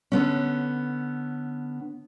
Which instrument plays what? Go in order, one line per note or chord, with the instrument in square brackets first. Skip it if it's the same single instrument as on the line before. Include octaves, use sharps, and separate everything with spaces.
[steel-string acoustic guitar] D3 B3 C#4